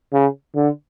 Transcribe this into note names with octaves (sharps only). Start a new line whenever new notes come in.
C#3
D3